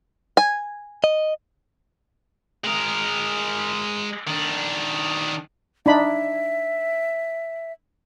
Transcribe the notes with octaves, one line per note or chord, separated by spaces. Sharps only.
G#5
D#5
G#3 A#4
D#3 D4
D4 D#4 E5 B5